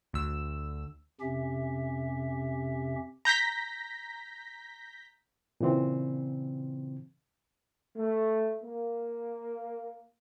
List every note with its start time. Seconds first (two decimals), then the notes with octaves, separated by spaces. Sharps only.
0.13 D2 E6
1.21 F2 C3 C#4 G4 E5
3.25 A#5 G6 A#6 B6
5.61 A#2 C#3 E3 C4
7.97 A3
8.63 A#3